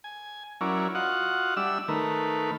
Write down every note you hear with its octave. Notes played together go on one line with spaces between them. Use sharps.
G#5
F#3 C#4 E4 A#4 D5
F4 F#4 D#5 F#5
G3 D4 E5 E6
D#3 A3 A#4 B4